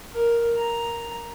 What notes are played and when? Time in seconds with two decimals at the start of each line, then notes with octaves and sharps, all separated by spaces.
0.13 A#4
0.57 A#5